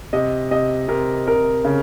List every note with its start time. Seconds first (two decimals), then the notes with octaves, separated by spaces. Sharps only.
0.13 C3 D#5
0.51 C3 D#5
0.88 C3 A#4
1.28 C3 A#4
1.65 C#3